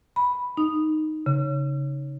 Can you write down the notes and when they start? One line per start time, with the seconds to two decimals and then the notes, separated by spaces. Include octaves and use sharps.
0.16 B5
0.57 D#4
1.26 C#3